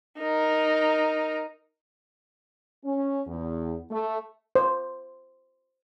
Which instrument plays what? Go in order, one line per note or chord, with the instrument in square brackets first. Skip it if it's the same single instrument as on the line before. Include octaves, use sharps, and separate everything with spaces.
[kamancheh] D#4 A#4
[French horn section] C#4
E2
A3
[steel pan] C5